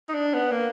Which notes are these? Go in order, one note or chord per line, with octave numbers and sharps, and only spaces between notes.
D#4
D4
B3
A#3